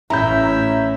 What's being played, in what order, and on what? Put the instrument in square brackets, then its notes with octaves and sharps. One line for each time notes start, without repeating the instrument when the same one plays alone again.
[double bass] A1 [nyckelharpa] C#4 E5 [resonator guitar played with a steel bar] E4 [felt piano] A#5 G6